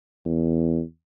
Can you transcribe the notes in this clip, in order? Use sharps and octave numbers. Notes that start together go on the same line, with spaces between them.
E2